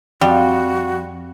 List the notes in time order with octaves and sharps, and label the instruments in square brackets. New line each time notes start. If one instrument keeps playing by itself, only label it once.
[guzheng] F2 [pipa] G3 [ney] F#4